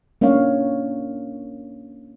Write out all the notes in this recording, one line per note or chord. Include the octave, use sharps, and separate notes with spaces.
A#3 C#4 D4 C#5 F5